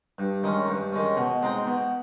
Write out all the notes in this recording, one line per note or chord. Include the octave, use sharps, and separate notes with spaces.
G2
D#3 G#3 C#4
G2
D#3 G#3 C#4
B2
G#3 C4 D#4
B2